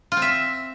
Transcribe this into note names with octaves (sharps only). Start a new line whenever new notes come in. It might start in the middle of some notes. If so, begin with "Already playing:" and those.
F4
C4
E5